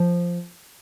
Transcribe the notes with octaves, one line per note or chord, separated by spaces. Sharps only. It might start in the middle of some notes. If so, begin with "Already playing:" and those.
Already playing: F3